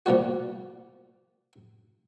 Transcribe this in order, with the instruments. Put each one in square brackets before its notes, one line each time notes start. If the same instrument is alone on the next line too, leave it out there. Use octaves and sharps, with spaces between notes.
[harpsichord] A#2 F3 G3 F#4